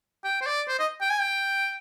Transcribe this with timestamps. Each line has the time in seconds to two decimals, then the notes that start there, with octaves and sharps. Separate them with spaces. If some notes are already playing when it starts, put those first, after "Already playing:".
0.24 G5
0.41 C5
0.46 D5
0.68 C5
0.79 D#5
1.01 G5
1.10 G#5
1.21 G5